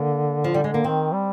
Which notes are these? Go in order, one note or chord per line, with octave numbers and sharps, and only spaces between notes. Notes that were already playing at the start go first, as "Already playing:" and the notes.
Already playing: D3 A#3
F3
G3
G#3
A#3
D#3 C4
G3